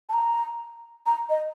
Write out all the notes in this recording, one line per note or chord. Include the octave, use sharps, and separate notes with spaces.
A5
A#5
A#5
D#5